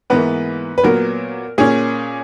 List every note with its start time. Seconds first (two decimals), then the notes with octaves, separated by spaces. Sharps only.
0.10 G#2 E3 A#3 B3 B4
0.78 B4
0.84 A#2 F#3 B3 A#4
1.58 A#2 A#3 C#4 G#4